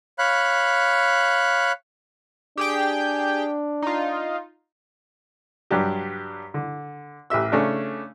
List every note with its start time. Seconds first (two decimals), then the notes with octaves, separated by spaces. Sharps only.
0.19 C#5 F5 B5 F#6
2.57 D4 G4 G#4 G5
3.82 D#4 F4
5.71 G2 F#3 D4 G4
6.54 D3
7.30 A1 G4 E5 E6
7.52 C#3 A3 C#4 D4